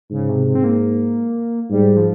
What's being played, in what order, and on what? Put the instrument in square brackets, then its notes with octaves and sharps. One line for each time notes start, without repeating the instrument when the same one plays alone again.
[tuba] G#2 [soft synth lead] C#3
[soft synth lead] C3
C3
C4
A#3
[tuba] G#2 [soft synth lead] G3
[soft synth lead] F3